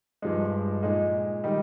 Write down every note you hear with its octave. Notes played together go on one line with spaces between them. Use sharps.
G2 F3 G#3 D#4
A#2 G#3 D#4
D#3 G3 D#4